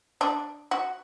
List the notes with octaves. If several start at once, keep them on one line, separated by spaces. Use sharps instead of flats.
D4
F#4